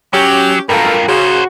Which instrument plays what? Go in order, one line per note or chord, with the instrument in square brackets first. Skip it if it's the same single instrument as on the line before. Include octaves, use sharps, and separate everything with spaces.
[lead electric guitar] F#3 [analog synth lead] C#4 [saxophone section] G4
[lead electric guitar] G2 F4 [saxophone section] B2 D3 A3 [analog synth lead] A#4
[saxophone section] C#3 [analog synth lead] F#4 [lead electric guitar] A#4 C5